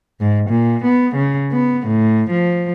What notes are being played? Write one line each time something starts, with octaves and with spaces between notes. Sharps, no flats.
G#2
A#2
B3
C#3
B3
A2
F3